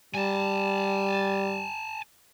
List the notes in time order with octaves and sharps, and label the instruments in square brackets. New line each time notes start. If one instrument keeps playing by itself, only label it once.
[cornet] G3 [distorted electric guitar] G#5 A5